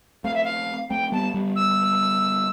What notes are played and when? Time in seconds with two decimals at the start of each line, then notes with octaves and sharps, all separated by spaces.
0.24 A3 C4 F5
0.34 E5
0.44 F5
0.90 A3 C4 G5
1.12 G3 B3 A5
1.34 G3 B3
1.56 E6